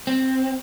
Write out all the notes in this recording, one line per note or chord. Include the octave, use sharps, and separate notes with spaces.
C4